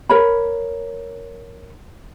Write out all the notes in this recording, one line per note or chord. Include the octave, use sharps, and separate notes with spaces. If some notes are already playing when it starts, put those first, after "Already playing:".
A#4 C#5 B5